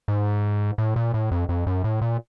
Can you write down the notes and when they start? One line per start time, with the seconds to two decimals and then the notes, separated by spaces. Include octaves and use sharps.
0.08 G#2
0.78 A2
0.96 A#2
1.14 A2
1.31 F2
1.49 F2
1.67 F#2
1.84 A2
2.01 A#2